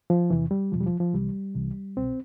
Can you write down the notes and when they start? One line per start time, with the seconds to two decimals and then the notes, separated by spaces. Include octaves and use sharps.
0.10 F3
0.30 E2 C3 E3
0.51 G3
0.72 E2 B2 F3
0.81 G3
0.86 F3
1.00 F3
1.13 C2 C3 E3 G3
1.55 C2 C3 E3
1.97 C2 B2 C4